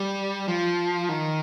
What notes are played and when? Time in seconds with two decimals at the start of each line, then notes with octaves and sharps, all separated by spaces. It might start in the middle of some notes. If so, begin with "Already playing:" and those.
Already playing: G3
0.48 F3
1.09 D#3